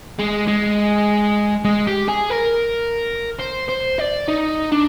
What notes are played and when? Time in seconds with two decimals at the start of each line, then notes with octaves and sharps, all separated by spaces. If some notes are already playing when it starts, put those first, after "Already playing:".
0.19 G#3
0.48 G#3
1.65 G#3
1.87 G4
2.08 G#4
2.30 A#4
3.40 C5
3.69 C5
3.99 D5
4.28 D#4
4.72 D4